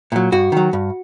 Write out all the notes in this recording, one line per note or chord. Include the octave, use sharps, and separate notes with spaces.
A#2 F#3
G2 F#4
D#3 F#3
G2